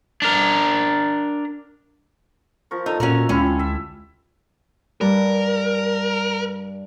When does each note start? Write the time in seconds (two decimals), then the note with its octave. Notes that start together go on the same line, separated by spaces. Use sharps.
0.22 D4 A#4
2.71 F3 A#4 C#6
2.86 D#4 A4
3.00 A#2 C#4 F#4 A#4
3.29 D2 G3 G#3 C#4 E4 F4
3.59 E5
5.01 G2 A#4